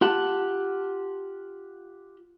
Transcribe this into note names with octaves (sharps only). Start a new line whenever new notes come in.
F4 G4 F#5 A5